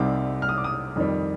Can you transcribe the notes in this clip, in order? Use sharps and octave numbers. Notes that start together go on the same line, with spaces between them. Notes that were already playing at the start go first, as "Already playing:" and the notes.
Already playing: C2 C3 G3 C4 D#4 D6
F6
D#6
D6
D#6
F2 D#3 G3